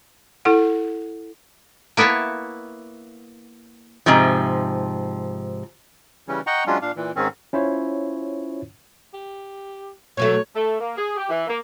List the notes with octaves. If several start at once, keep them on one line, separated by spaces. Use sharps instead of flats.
E4 A4 F#5
A#3 B3 E4 C#5 A5
G#2 C3 F3
C#3 E3 G3 C#4
D#5 F#5 G5 A#5 C#6
F#3 G#3 C#4 D4 F4
A#2 D4 F5
A#2 E3
G#2 D#3 C4 C#4
C#4 E4 F4 C5 C#5
G4
B2 F#3 A3 C#5
A3
A#3
G#4
G4
E3
A#3